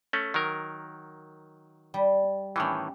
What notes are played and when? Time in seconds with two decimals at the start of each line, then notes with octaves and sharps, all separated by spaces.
0.13 A3 C#4
0.34 D#3 F#3 A#4
1.94 G3
2.56 A2 D#3 E3 C#4 G4